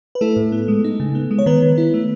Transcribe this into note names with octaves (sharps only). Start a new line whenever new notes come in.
B4
A3 E4 A4
A2
B3
G#3
D#4
C#3
B3
G#3
C#5
D#3 B3 B4
D#3
E4
A3